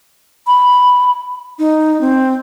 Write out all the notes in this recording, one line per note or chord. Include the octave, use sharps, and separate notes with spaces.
B5
D#4
C4